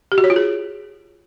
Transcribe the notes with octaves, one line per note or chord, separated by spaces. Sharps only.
G4
F#4
C#5
F4
G#4